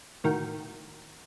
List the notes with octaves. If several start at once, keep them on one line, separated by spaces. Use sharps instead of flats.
A2 D#3 F#4 A#4 G5